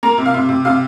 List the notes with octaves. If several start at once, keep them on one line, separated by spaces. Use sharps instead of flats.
A#3 A#5
C3
F5
C3
C3
C3 F5